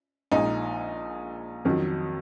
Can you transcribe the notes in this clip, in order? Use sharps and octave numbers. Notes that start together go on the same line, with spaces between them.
A#1 A#2 G#3 D#4
F2 D#3 F#3